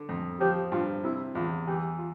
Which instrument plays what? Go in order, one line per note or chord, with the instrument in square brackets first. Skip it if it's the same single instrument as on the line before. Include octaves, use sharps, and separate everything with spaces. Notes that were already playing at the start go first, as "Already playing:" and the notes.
Already playing: [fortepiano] D3
F2
[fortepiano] F3 [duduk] G4
[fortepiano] G2 [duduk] F4
[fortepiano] C3 [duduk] E4
[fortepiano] E2 [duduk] F4
[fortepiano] E3 [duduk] G4
[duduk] F4